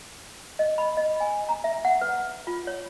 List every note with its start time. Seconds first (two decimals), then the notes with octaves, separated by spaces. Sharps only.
0.59 D#5
0.78 B5
0.97 D#5
1.20 G#5
1.49 A#5
1.64 E5
1.85 F#5
2.01 B4
2.47 F4
2.67 C#5